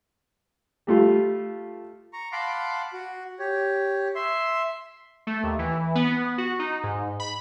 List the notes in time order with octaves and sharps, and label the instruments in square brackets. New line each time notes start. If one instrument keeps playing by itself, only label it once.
[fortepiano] G3 A3 F4
[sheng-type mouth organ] A#5 C#6
F5 F#5 A5 B5 C6 D6
F#4
G4 C#5
E5 C6
[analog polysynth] A3
D#2
E3
B3
F#4
D#4
G#2
B5